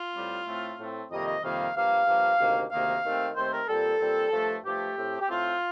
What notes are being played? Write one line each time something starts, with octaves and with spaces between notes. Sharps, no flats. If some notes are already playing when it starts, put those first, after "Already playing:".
Already playing: F4
A2 G3 C4
A2 A3 C4
A2 A3 C4
F2 C3 D#3 G3 A#3 D#5
D#5
F2 C3 D#3 G3 A#3 F5
G2 F3 A#3 F5
G2 F3 A#3
D2 C3 D#3 A#3
D2 C3 D#3 A#3 F5
D#2 D#3 A3 C4
D#2 D#3 A3 C4 C5
A#4
A#2 G3 C4 A4
A#2 G3 C4
G2 F3 A3
G2 F3 A3 G4
A2 A3 C4
G4
A2 A3 C4 F4